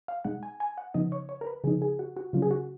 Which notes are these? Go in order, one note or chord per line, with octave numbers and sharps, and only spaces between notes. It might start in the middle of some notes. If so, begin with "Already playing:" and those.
F5
B2 G#3 D#4 F#5
G#5
G#5
F#5
C#3 F3 B3 D#4 D#5
C#5
C#5
A#4
B4
C#3 F3 B3 D#4 G#4
G#4
F#4
F#4
C#3 F#3 C#4 F4
G#4
F#4